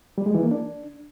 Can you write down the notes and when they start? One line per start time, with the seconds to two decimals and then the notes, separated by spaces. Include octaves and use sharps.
0.18 G3
0.26 G#3
0.34 E3
0.43 A#3
0.51 D4